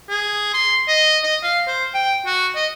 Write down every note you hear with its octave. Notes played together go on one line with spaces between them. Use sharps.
G#4
C6
D#5
D#5
F5
C5
G5
F#4
D#5